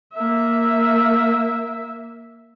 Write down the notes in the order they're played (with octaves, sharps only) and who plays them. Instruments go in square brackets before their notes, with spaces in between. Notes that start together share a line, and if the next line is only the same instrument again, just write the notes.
[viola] A#3 E5